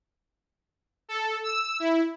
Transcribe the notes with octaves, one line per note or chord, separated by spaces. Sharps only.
A4
E6
E4